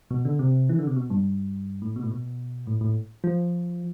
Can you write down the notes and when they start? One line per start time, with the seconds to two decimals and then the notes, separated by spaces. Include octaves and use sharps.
0.11 B2
0.25 D3
0.39 C3
0.69 E3
0.79 D3
0.87 C3
0.96 B2
1.10 G2
1.82 A2
1.96 B2
2.03 A2
2.11 B2
2.67 A2
2.81 A2
3.24 F3